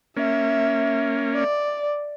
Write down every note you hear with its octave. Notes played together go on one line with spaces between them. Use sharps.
A#3 C#4 E5
D5